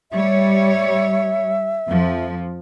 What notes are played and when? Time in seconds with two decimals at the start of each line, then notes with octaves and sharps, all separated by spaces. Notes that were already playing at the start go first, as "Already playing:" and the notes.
0.11 G3 C#5 E5
1.89 F2 F3